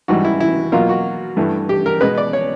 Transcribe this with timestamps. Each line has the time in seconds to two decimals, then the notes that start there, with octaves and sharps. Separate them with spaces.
0.08 G#2 E3 G3 F#4
0.25 E4
0.40 E4
0.72 B2 F#3 A#3 F4
0.89 F#4
1.37 G2 E3 A3
1.69 G4
1.86 A#4
2.01 B2 G#3 B3 B4
2.18 D5
2.33 C#5